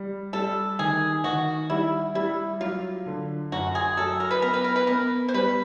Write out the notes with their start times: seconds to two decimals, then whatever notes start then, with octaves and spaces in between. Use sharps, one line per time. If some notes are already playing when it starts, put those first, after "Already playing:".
Already playing: G3
0.33 G3 A4
0.79 D#3 G#4
1.24 D#3 F#4
1.70 G3 E4
2.15 G3 E4
2.60 F#3 F4
3.06 D3
3.52 F#2 F#4
3.75 G#4
3.97 F#3 A4
4.20 A#4
4.31 B4
4.42 B3 A#4
4.54 B4
4.64 A#4
4.76 B4
4.87 B3 A#4
5.28 C5
5.34 G3 B4